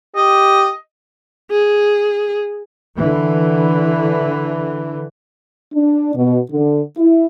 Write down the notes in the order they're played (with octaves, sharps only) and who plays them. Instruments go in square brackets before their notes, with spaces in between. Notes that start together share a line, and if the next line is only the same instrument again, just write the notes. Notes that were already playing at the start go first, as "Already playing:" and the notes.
[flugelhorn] G4 [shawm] D#5
[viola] G#4
[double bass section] D3 E3
[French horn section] D4
B2
D3
E4